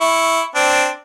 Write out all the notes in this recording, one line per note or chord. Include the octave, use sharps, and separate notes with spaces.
E4 C#6
C4 D4